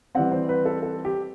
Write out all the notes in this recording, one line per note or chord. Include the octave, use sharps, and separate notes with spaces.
E3 G3 C4 F#5
C5
B4
A4
A4
G4